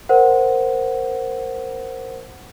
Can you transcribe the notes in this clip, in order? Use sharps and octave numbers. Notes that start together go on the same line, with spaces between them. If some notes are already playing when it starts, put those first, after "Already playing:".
A#4 C5 F#5